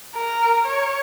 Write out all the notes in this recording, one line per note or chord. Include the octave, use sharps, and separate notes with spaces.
A#4
C#5